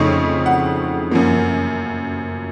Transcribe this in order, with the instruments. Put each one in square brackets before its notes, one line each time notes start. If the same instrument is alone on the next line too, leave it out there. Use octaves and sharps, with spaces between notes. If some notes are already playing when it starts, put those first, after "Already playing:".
Already playing: [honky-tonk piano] F2 C#3 A3 C4 D#4 C#5
F#5
F#2 F3 A#3